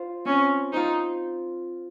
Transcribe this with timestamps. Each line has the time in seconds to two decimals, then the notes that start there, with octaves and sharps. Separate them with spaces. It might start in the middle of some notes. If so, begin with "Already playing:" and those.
Already playing: F4 C5
0.25 C4 C#4
0.73 D#4 F4 C5